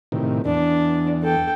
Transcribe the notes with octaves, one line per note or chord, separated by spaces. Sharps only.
A2 C3 D#3
E2 D4
A4 G5